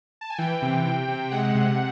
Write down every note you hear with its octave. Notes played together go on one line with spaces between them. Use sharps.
A5
G#5
E3 G5
C3
C3
C3
G#3 F#5
C3